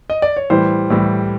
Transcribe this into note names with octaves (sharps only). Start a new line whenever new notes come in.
D#5
D5
C#5
A2 E3 G3 C5
A2 E3 G3